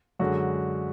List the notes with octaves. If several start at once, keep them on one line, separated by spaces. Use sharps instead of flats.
F#2 D3 G#3 F#4